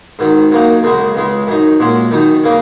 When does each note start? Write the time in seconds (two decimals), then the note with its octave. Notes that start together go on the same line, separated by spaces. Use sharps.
0.19 G#2 D#3 F#3
0.52 F#2 F#3 A#3 D#4 F#4
0.83 F#2 C#3 G#3 F#4
1.15 C#2 C#3 G#3
1.47 F#2 F#3 D#4
1.79 A#2 G#3 C#4 F#4
2.11 F#2 D#3 F#3 D#4
2.44 C#3 A#3 C#4